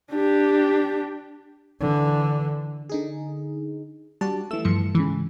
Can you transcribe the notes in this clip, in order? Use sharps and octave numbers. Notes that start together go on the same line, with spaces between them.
D4 G4
D3 E3
D3 D#4 G#4
G3 D4 F#4 A5
E3 A3 E6 E7
G2 F3 C#7
G#2 C#3 E3